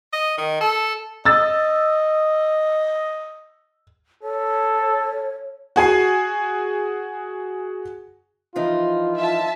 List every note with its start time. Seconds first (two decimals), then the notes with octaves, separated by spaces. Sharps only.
0.13 D#5
0.38 D#3
0.61 A4
1.25 D#5 E6 A6
4.23 A4 C#5
5.76 F#4 G#4 G#5 C7
8.56 E3 F3 D#4 F4
9.18 E5 A5